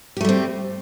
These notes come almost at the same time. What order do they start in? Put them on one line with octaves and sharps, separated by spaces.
G4 A3 G3 C4